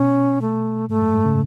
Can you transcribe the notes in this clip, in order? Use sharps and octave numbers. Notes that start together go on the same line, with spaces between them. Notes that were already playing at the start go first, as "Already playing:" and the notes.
Already playing: B2 C#4
A3
G#2 A3
F#2
G#2
C#3